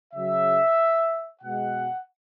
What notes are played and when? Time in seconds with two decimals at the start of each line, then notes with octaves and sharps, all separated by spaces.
0.14 C#3 F#3 E5
1.42 B2 G#3 F#5